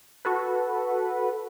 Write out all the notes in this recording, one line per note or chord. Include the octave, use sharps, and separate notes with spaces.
F#4 A4 B4